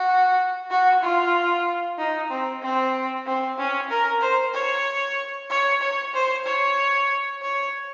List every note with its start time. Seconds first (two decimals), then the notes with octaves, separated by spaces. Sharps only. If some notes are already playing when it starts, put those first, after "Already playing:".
Already playing: F#4
0.70 F#4
1.02 F4
1.98 D#4
2.30 C4
2.62 C4
3.26 C4
3.58 C#4
3.89 A#4
4.21 C5
4.53 C#5
5.50 C#5
5.81 C#5
6.13 C5
6.45 C#5
7.42 C#5